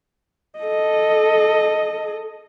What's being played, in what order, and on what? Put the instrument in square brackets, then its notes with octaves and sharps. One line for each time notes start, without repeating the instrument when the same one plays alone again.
[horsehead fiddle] A4 D#5